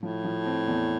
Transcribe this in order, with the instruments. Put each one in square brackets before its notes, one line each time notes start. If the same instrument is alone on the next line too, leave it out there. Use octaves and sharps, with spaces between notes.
[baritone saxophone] A2 [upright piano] F3
[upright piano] F3
C4
E2